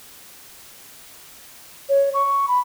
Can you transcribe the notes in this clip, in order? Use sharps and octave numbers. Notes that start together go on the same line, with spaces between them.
C#5
C#6
B5